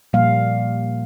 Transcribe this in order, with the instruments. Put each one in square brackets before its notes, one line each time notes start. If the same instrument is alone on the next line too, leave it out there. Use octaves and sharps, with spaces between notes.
[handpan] A#2 F3 G3 A#3 F5